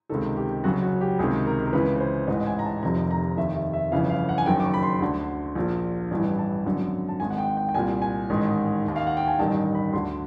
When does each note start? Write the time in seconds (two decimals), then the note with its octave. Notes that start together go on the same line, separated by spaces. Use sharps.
0.10 C#2 C3 D#3 A4
0.37 G4
0.64 F#1 F#2 C#3 F#4
0.82 F#4
1.01 G4
1.19 C#2 C3 D#3 G#4
1.47 A#4
1.66 A#4
1.73 C#2 C#3 E3 B4
1.96 B4
2.00 C5
2.27 A1 G#2 E3 D#5
2.47 G#5
2.59 A#5
2.65 A5
2.83 F1 F2 C3 D#3 A#5
3.11 A#5
3.37 F1 D#2 D#3 E5
3.56 E5
3.73 E5
3.92 G1 F2 C#3 E3 F5
4.10 F5
4.29 F#5
4.38 G#5
4.46 F#1 F#2 D#3 G5
4.60 D6
4.65 C#6
4.74 B5
4.83 C6
5.01 D2 D3
5.55 A#1 A#2
6.11 A1 G2 E3
6.39 A5
6.65 G#1 F#2 D3
7.08 A5
7.20 G#1 G#2 D#3 G#5
7.30 F#5
7.38 G5
7.57 G5
7.69 G5
7.74 C2 A#2 G#5
8.02 G#5
8.30 A1 G#2 D#3
8.85 D#2 D#3
8.96 F5
9.07 F#5
9.17 G5
9.27 G#5
9.39 A1 G2 D#3 A5
9.75 B5
9.93 D2 D3 C6